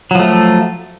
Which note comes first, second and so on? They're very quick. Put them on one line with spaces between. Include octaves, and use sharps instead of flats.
F#3 F3 A3